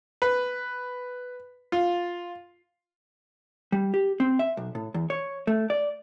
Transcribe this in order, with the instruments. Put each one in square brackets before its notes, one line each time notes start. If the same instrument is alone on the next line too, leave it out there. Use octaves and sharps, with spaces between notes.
[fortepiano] B4
F4
[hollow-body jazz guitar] G3
G4
C4
E5
B1
A2
E2
C#5
A3
D5